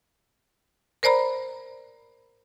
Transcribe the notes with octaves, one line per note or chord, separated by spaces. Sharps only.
A#4 C5 D5 A#5 B5